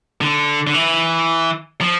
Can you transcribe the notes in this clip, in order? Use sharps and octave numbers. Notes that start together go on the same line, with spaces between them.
D3
D3
E3
F3